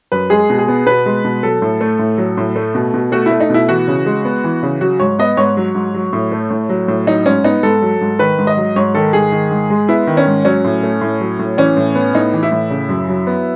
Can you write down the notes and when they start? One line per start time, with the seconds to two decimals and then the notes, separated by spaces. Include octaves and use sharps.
0.12 F#2 B4
0.30 G#3 G#4
0.50 B2
0.59 G#4
0.68 B3
0.86 B2 B4
1.06 G#3
1.24 B2
1.43 F#3 A4
1.62 A2
1.81 A3
1.99 A2
2.18 F#3
2.37 A2
2.56 A3
2.75 B2
2.94 B2
3.12 A3 F#4
3.26 E4
3.31 A3
3.40 D#4
3.50 B2 E4
3.69 E3 F#4
3.88 C#3
4.06 G#3
4.25 B3
4.44 E3
4.63 C#3
4.81 F#3 F#4
5.00 G#2 C#5
5.19 B3 D#5
5.37 G#2 C#5
5.57 F#3
5.75 G#2
5.94 F#3
6.13 A2
6.32 A3
6.50 A2
6.69 F#3
6.88 A2
7.07 F#3 D#4
7.26 G#2 C#4
7.44 B3 D#4
7.63 G#2 A4
7.82 F#3
8.01 G#2
8.19 D#3 B4
8.39 G#2
8.47 D#5
8.57 F#3
8.76 G#2 C#5
8.95 D#3 A4
9.13 G#2 G#4
9.32 D#3
9.51 G#2
9.70 G#3
9.89 B3 E4
10.07 D#3
10.17 C#4
10.27 G#2
10.45 F#3 C#4
10.64 A2
10.83 A3
11.01 A2
11.21 F#3
11.39 A2
11.57 E3 C#4
11.77 A2
11.95 B3
12.15 A2 D#4
12.33 E3
12.43 E4
12.52 A2
12.70 C#3
12.89 F#2
13.09 F#3
13.27 B3